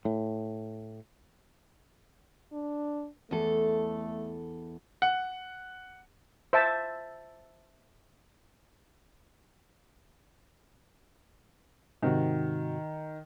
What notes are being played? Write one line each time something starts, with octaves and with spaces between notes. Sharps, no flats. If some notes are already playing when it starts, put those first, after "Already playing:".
A2
D4
E2 A3 A4
F#5
C5 E5 A5
G#2 C3 D#3 F#4